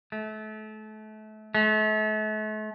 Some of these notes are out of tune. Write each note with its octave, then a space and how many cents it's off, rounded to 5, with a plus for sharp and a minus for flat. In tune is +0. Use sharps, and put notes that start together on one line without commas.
A3 -30
A3 -40